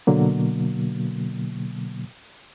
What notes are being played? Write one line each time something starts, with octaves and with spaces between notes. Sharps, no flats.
B2 D3 F#3 A#3